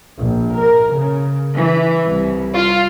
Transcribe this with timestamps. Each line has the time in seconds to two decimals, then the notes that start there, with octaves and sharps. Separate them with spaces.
0.18 A#1
0.57 A#4
0.96 C#3
1.53 E3
2.08 C2
2.56 F4